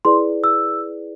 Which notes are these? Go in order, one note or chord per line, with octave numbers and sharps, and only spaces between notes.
E4 G#4 B4 D5 C6
E6